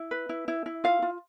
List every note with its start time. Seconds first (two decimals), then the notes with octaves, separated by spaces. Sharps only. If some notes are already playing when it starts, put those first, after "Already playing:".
Already playing: E4 E5
0.11 B4
0.29 E4
0.48 E4
0.66 E4
0.84 F4 F5
1.02 F4